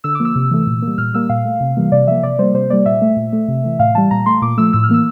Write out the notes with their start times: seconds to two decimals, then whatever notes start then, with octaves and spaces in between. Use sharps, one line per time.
0.04 D3 E6
0.15 F3 A#3 D6
0.25 E6
0.35 C3
0.51 E3 A3
0.67 A#2
0.82 G3 A#3
0.98 A#2 F6
1.14 G3 A#3 E6
1.29 A#2 F5
1.45 A3
1.60 C3
1.77 E3 G3 A#3
1.92 C3 D5
2.08 F3 A#3 E5
2.23 C3 D5
2.39 G3 A#3 C5
2.54 C3 C5
2.70 G3 A#3 D5
2.86 A#2 E5
3.02 A3
3.16 A#2
3.33 A3
3.48 C3
3.64 E3 A3
3.79 A2 F5
3.95 E3 G3 A5
4.11 A#2 A#5
4.26 A3 C6
4.42 A#2 D6
4.57 F3 A3 E6
4.73 A2 E6
4.84 F6
4.89 E3 A#3 E6